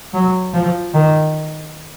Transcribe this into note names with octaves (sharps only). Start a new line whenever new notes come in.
F#3
F3
D#3